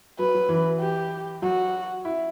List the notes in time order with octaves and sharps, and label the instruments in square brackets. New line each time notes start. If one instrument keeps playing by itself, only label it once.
[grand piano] F#3 [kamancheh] B4
[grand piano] F#3
E3
[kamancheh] G4
[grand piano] F#3 [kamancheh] F#4
[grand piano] E4